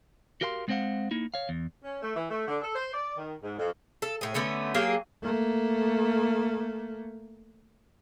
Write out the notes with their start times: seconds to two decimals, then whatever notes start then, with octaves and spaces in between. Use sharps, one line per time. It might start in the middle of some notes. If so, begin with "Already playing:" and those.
0.41 F#4 G4 A#4 F5 G#5 C6
0.68 G#3 B3 C4 C5 F5 F#5
1.11 A#3 D#4 E4
1.34 C#5 F5
1.49 E2
1.83 C#4
2.02 A3
2.15 E3
2.30 A3
2.48 D3
2.62 A4
2.75 C5
2.93 D5
3.17 D#3
3.43 G#2
3.58 F2
4.02 A4
4.21 A2 G#4
4.34 D3 A3 B3 C#4
4.74 F#3 A#3 G4 G#4
5.22 A3 A#3